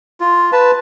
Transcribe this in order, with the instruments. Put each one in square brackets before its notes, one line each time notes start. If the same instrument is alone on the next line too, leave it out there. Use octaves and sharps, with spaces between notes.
[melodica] F4
B4 A5